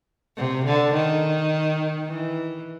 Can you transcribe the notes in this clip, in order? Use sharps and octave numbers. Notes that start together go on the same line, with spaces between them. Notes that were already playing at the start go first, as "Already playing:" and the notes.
C3
D3
D#3
E3